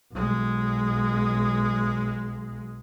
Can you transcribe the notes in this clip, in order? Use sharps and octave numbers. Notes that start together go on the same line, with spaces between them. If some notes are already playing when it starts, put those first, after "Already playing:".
B1 G#3